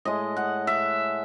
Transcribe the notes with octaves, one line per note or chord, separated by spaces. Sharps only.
A2 G#3 D#5
F#5
E5